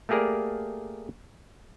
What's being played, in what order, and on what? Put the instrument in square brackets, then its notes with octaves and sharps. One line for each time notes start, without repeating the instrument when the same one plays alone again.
[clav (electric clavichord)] A3 A#3 G4 G#4 A#4 D5